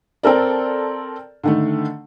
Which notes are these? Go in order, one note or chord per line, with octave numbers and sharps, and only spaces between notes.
C4 A4 A#4 D5
D3 D#3 A3